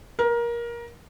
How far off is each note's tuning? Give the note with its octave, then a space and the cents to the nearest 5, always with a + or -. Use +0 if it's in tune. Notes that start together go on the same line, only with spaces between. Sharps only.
A#4 +20